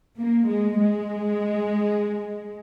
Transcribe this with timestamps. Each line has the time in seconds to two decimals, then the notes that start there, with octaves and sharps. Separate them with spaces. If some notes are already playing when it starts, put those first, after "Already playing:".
0.19 A#3
0.48 G#3
0.77 G#3